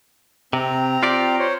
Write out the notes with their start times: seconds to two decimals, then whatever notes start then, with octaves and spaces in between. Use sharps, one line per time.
0.53 C3 C4 A#5
1.03 F4 G4 D5
1.39 C5 C#5